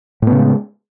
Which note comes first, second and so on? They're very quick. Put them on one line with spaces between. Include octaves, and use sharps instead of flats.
A2 B3 C#3 G#3